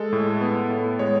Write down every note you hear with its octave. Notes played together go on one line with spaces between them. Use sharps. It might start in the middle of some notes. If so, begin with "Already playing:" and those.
Already playing: G#3 A4
A2
B3
A2
G#3 C#5